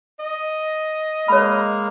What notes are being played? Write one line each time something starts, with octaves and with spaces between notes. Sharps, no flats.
D#5
G#3 A#3 C#5 B5 F6